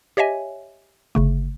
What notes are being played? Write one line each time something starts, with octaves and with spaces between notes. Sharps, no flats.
G4 C#5 D#5 E5 G#5
G1 C#3 A3